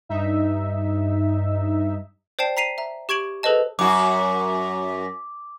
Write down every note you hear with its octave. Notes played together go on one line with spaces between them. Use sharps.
G2 D#4 E5
C5 D5 G5 A5 C7 E7
A#5 B6 C7 D#7 F7
E5 A#5
G4 C#6 G#6 D7 F#7
G#4 A4 B4 C5 D#5 A5
F#2 F#4 D6